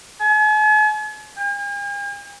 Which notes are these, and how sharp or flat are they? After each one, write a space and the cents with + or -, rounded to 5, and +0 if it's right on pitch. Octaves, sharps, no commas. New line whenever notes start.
G#5 +45
G#5 -45